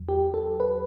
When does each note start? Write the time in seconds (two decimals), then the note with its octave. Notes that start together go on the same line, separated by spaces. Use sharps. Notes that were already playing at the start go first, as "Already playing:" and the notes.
Already playing: E2 F#3
0.09 G4
0.34 A4
0.60 B4